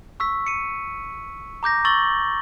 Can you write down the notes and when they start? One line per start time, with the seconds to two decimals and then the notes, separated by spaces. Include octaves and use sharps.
0.20 C#6 E6 B6
0.47 C#7 D#7
1.63 A#5 D6 G6 A#6
1.85 C#6 E6 A6 F#7 G7